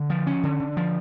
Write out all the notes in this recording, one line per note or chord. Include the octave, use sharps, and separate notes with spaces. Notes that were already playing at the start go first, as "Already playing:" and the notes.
Already playing: D3
F3
C#4
D3
D3
F3